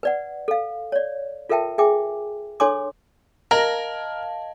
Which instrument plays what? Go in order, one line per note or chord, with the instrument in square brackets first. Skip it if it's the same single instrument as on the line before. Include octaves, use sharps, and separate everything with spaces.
[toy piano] B4 D5 F#5
A4 F5
C#5 D5
F4 A4 A#4 E5 G5 A5
G#4 E5 G5 G#5 D6
D4 A4 C#5 G#5 C6 D6
[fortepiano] A#4 [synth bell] D#5 F5 A5 [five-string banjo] A#5